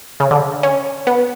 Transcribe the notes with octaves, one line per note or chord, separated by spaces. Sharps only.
C#3
D3
C#4
B3